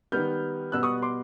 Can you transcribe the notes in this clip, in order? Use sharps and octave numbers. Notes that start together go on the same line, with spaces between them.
D#3 G3 B3 F6 G6
B2 G3 B3 E6 F#6
C#6 D#6
C6 D6